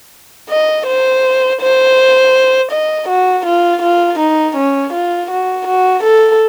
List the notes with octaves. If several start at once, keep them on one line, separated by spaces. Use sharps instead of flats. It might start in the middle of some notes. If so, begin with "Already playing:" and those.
D#5
C5
C5
D#5
F#4
F4
F4
D#4
C#4
F4
F#4
F#4
A4